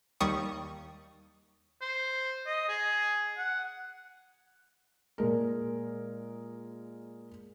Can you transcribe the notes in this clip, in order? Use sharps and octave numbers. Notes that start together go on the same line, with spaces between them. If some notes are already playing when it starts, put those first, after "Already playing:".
D#2 G3 C#6 D#6
C5
D#5
G#4
F#5
A#2 G#3 A#4